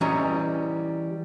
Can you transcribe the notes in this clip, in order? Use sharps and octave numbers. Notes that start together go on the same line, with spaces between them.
E3 G3 C#4 C#5 D#5 A#5